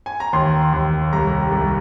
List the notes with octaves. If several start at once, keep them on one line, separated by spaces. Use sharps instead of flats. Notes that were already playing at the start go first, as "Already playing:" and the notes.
G#5
A#5
D#2 C6
D#2
C2 A#5
C2